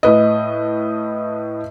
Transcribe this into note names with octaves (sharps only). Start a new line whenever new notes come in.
A2 B4 D#5